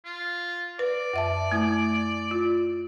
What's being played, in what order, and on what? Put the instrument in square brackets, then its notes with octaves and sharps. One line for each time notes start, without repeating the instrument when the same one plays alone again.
[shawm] F4
[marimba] B4 [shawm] D5
[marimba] F#2 E5 A5
A3 E4
F4